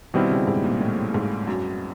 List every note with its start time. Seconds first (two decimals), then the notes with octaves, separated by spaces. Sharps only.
0.14 B2 D#3 G3 C4 E4
0.31 C#3
0.47 G#2
0.64 A#2
0.80 A2
1.14 G#2
1.47 F#2